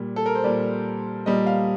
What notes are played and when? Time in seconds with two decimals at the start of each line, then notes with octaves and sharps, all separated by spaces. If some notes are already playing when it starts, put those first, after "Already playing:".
Already playing: A#2 G3
0.16 A4
0.26 A#4
0.35 C5
0.44 A#2 G3 D5
1.26 A#2 G3 D#5
1.47 F5